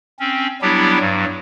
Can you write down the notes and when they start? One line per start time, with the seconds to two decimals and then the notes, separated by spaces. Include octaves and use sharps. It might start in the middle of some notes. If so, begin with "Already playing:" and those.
0.20 C4 C#4
0.62 F#3 G3 B3 D4 E4 G4
1.00 G2 F#3